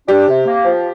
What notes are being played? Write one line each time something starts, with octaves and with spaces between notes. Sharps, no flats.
D4 G4
C3
A#3
F3